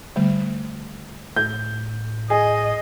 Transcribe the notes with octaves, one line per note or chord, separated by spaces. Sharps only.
D3 G3 A3
A2 G6
G#4 D#5